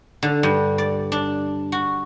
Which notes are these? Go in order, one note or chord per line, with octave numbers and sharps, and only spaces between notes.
D3
G2
D5
D4
F#4